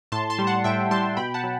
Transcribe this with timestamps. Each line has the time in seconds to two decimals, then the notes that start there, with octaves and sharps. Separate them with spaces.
0.12 A2 A5 C6
0.30 A5 C6
0.39 G3
0.47 F#5 A5
0.64 A2 E5 G5
0.91 G3 A5 C6
1.17 B2 G5 B5
1.34 F#5 A5
1.44 F#3